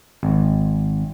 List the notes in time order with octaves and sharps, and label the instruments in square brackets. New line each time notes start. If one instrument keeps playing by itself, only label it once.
[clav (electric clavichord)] G#1